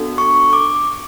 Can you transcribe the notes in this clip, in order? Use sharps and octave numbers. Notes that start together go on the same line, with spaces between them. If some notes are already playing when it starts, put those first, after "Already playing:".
Already playing: B3 D4 F#4 A4
C#6
D6